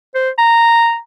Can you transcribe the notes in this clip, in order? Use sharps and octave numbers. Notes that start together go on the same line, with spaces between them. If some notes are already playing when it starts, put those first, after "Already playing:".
C5
A#5